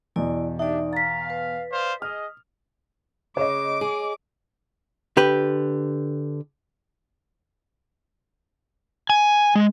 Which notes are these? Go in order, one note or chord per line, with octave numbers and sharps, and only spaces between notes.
E2 B2 E4 D5
D4 D#4 G4 D5 E5
F5 A#5 A6 B6
B4
C5 D5 F5
G#4 D#5 D#6 F6
C#3 C#5 D#5 D6
G#4
D3 G4 B4
G#5
G#3